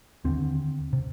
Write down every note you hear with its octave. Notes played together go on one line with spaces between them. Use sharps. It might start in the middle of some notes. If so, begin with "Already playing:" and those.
D#2 D3 C4
C3